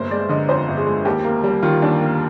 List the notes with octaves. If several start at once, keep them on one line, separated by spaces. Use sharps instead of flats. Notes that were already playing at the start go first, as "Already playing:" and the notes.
Already playing: G1 A#3 C5
G#3 D5
D3 D#5
F2 C5
G1
G#4
G#3
D#2 G4
A#3
G3
D#3 F4
D#2 D4
A#3